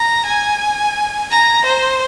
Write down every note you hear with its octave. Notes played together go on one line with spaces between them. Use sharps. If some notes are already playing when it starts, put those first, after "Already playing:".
Already playing: A#5
G#5
A#5
C5